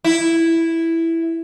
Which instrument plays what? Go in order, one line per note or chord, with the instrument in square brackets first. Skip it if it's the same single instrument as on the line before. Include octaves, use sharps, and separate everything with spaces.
[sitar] E4